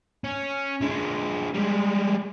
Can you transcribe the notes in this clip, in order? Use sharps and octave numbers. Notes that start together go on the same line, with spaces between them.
C#4
D3 G#3
G3 G#3